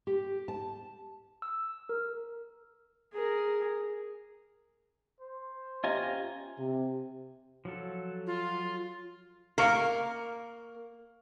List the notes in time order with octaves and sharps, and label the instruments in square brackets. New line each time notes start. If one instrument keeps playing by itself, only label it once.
[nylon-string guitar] G4
A5
[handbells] E6
A#4
[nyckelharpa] G#4 A#4
[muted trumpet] C5
[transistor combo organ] C#4 G4 [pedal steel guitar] F4 G#5 A#5 [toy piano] D#5 E5
[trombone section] C3
[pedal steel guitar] F3 F#3 A4
[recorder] F4
[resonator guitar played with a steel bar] A#3 A#4 [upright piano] F5 C#6 C#7